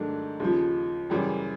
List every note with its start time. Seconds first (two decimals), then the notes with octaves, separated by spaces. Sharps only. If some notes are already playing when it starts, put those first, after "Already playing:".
Already playing: G#2 D#3 F#3 A3 D4
0.40 D#2 C#3 F3
1.10 F#2 C#3 E3 G3